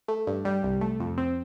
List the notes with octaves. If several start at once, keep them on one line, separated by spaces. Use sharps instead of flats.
A3
G2
G3
C2
A3
F2
C4